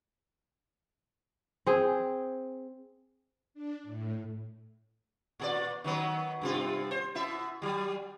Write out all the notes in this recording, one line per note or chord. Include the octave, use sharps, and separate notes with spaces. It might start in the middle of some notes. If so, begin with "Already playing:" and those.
C4 G#4
D4
A2
A#2 G#4 D5
D#3 F#3 B3
G2 C3 F4
C5
B2 E4 E5
F#3 G3